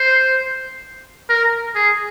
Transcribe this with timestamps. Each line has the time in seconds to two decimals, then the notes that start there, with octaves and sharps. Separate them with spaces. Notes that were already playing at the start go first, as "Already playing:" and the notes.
Already playing: C5
1.29 A#4
1.75 G#4